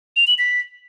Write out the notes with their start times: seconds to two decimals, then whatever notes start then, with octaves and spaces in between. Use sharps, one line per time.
0.16 F7
0.27 F#7
0.38 B6